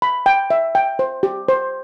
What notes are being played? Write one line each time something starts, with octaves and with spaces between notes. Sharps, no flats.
B5
G5
E5
G5
C5
G4
C5